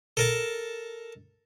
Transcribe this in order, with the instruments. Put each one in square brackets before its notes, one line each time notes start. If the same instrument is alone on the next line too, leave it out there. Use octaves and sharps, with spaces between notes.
[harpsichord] A4 A#4 A5